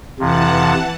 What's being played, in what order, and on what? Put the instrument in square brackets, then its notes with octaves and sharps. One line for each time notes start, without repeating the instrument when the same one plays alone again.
[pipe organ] F2 C3 [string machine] E3 F#5 A5